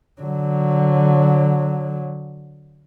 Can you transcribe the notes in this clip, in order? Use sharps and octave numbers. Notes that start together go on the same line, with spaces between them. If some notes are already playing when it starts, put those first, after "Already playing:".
D3 F#3